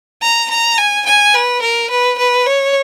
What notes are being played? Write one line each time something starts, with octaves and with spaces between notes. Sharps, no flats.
A#5
A#5
G#5
G#5
B4
A#4
B4
B4
C#5